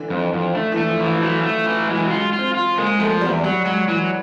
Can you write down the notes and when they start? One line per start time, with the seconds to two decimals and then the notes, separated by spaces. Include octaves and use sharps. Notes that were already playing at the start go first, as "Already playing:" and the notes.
Already playing: D3 E3
0.10 F2
0.33 F2
0.55 D3 A3
0.72 E3
0.77 A3
0.89 F3
1.00 E3
1.05 F3
1.22 F#3 A3
1.43 A3
1.66 E3
1.88 F#3 G#3
2.05 F#3
2.11 F4
2.21 G#3
2.33 F4
2.39 C4
2.54 F4
2.78 G#3 A#3
2.99 F3 A3
3.21 E2 G3
3.44 F#3 G3
3.65 F#3 G#3
3.88 E3 F#3